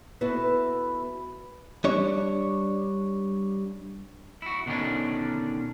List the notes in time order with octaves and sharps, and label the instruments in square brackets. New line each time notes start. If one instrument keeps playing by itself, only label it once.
[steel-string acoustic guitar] B3 E4 F#4 A4 B4
[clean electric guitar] G3 D4 C#5
E4 F#4
B2 D3 D#3 B3 C#4 D4